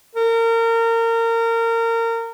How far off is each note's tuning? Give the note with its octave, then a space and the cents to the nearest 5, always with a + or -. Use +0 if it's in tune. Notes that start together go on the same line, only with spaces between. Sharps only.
A#4 -25